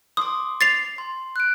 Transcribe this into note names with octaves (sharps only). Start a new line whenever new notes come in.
C6 D6 D#6
A6 C7 F7
C6
F#6 D7